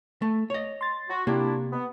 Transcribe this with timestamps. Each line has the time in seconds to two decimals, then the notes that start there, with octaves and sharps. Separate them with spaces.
0.22 A3
0.50 C#5 D#5
0.81 C6 A6
1.09 F#4
1.27 C3 A#3 D4 E4 F4 G4
1.71 B3